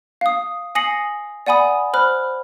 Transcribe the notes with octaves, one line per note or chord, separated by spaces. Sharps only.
F5 D#6
G#5 D#6 A#6 C7 C#7 F#7
D5 F#5 G#5 B5 D#6
C5 B5 F6 F#6